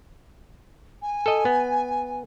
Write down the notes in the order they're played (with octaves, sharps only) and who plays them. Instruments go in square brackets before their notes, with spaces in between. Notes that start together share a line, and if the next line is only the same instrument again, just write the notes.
[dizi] G#5
[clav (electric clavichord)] A4 D#5
B3